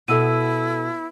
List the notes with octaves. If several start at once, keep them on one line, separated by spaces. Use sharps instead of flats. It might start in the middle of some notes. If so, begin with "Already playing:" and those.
B2 E4 A4 E6 D#7